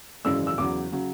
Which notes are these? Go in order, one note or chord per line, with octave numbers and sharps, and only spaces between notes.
G#1 F#2 C#3 E3 G#3 E6
E6
E2 C#3 F#3 D6
C#3 F#3